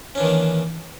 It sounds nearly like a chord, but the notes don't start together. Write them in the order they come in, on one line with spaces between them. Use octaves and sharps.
C#4 D4 E3 D#3 A#3